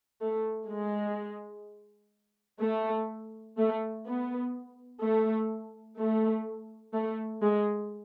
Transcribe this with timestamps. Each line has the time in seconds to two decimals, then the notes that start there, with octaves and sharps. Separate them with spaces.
0.22 A3
0.70 G#3
2.62 A3
3.57 A3
4.06 B3
5.02 A3
5.98 A3
6.94 A3
7.42 G#3